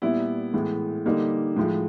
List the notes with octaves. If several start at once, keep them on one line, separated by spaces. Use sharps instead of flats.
A#2 G3 B3 E4
A2 E3 G#3 B3
D3 G3 A#3 D#4
A2 F3 G#3